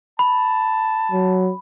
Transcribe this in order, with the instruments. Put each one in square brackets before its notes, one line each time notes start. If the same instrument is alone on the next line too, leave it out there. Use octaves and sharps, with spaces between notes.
[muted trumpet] A5 [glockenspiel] B5
[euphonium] F#3